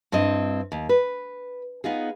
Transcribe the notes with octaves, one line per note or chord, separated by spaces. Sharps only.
G2 C4 E4 D#5
D#2
B4
B3 D#4 F4 G#4